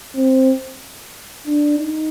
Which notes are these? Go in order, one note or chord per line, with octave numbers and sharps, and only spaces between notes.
C4
D4
D#4